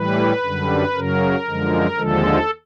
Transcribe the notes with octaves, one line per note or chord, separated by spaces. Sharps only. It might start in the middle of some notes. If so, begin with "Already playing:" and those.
Already playing: A2 E3 G3 B4
F#2 D3 G3
F#2 C#3 F#3 A#4
F#2 D3 F3 G#3
D#2 D3 F3 G#3 A4